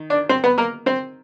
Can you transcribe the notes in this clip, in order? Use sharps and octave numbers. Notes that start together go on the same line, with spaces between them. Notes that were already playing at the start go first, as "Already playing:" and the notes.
Already playing: D#3
D4 D5
C4 C5
B3 B4
A#3 A#4
C4 C5